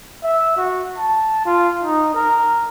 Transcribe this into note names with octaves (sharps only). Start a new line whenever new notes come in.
E5
F#4
A5
F4
D#4
A#4